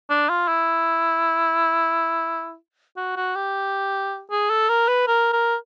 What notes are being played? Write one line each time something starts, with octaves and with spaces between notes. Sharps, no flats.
D4
F4
E4
F#4
F#4
G4
G#4
A4
A#4
B4
A#4
A#4